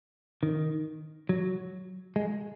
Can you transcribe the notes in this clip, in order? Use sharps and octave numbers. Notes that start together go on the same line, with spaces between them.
D#3
F#3
G#3